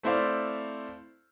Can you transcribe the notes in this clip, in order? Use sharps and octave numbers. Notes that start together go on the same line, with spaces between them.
A3 C4 E4 C5 D5 F5